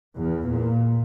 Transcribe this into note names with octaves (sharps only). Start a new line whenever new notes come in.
E2
A#2